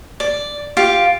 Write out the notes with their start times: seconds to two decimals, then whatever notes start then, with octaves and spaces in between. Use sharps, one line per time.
0.20 D5
0.77 F4 G4 F5